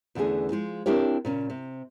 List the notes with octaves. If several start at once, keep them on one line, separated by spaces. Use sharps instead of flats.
E2 D3 E3 A3 C#4 G#4
F3 G#3
C4 D4 E4 G4 A#4 C#5
A#2 C#3 C#4
C3